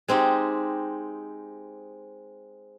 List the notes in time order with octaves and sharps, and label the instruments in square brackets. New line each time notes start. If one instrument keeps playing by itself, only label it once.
[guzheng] G#3 C4 D#4 G4